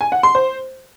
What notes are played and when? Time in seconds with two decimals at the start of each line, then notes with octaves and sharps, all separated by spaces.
0.01 G#5
0.12 F#5
0.23 C6
0.35 C5